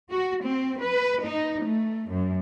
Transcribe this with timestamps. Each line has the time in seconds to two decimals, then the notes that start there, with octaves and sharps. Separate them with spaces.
0.10 F#4
0.44 C4
0.80 B4
1.24 D#4
1.63 A3
2.08 F#2